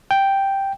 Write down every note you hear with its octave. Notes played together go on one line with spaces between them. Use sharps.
G5